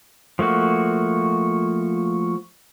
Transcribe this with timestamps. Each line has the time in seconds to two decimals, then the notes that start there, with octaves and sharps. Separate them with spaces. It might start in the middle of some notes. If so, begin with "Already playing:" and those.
0.39 F3 A3 A#3 F#4